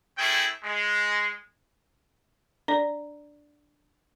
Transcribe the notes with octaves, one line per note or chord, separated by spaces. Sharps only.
A3 C#4 E4 G#4 G5
G#3
D4 D5